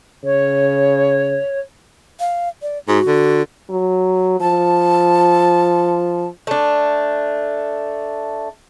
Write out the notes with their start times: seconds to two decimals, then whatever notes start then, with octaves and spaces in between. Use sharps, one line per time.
0.24 C#3 C#5
2.20 F5
2.62 D5
2.88 G#2 F#4
3.06 D3
3.70 F#3
4.41 F3 A5
6.47 A3 D4